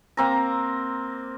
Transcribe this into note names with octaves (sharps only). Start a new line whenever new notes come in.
A#3 C4 A#5